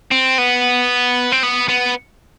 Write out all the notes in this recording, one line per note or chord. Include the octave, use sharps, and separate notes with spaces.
C4
B3
C4
B3
B3